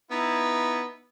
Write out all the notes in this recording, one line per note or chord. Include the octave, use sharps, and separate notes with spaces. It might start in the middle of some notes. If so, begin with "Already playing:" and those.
B3 D#4 E4